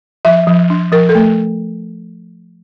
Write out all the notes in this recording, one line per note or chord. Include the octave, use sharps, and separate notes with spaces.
F3 E5
F3
D4
F3 A#4
A4
A3